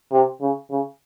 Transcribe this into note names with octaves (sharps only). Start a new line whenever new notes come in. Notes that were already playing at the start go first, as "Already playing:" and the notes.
C3
C#3
C#3